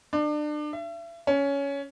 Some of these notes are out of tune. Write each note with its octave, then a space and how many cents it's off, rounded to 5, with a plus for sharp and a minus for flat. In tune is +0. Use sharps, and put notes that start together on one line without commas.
D4 +30
E5 +40
C#4 +15